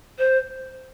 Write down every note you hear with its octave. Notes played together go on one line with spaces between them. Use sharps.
C5